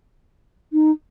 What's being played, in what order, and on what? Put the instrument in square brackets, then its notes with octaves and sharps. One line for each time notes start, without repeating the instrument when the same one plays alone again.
[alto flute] D#4